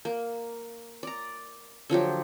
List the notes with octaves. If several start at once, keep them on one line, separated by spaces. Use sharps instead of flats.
A#3
D5 A#5
D3 F3 F#3 G4